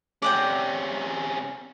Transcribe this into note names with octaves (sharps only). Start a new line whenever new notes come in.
C3 C#4 D5 F#5 G5